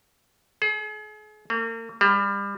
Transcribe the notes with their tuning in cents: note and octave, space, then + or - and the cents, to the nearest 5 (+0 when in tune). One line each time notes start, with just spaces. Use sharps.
G#4 +40
A#3 -40
G3 +30